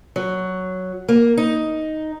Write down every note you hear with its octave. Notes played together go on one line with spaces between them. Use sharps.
F#3
A#3
D#4